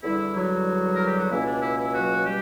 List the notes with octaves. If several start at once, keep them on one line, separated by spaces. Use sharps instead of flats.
E2 D3 G3 E4
F#3 F#4
A#4
G4
F#4
C#2 B2 A#3 C#4 E4
D4
E4
E4
F#3 F#4
G3 G4